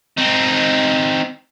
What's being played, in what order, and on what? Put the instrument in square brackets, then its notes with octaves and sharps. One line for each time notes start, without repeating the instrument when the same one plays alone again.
[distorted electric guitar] C4 D#4